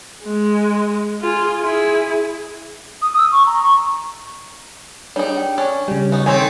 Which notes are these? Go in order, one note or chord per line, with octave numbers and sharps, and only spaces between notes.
G#3
F4 G#4
E4 G#4
D#6
E6
C#6
A#5
C#6
G3 D4 D#4 G#4 C#5
G5
C#4 D4
C#3 G3 C#5
B3 D#4 F#4
D#3 C4 G#4 A4 C#5 G#5